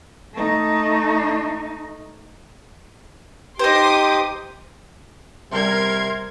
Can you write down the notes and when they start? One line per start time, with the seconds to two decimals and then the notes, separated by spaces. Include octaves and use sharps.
0.34 A3 D#4
3.59 D#4 G4 C5 C6 D6 D#6
5.52 C3 G3 A#4 C6 G#6